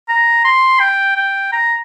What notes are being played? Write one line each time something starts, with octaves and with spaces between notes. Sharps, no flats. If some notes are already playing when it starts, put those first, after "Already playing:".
A#5
C6
G5
G5
A#5